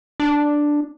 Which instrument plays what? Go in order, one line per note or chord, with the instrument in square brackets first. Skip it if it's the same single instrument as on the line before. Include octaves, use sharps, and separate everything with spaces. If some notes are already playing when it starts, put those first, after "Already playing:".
[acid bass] D4